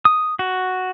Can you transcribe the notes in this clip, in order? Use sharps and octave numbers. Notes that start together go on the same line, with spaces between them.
D#6
F#4